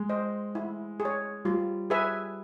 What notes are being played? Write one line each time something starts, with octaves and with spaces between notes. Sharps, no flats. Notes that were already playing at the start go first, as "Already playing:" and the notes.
Already playing: G#3
C5 D#5
E4
G#4
C#5
G3 F4
G#4 B4 E5 G#5